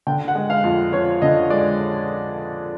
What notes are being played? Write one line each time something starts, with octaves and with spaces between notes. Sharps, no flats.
D3 G5
F#5
G#3
F5
F2
F3 C#5
D3 D#5
G#3 D5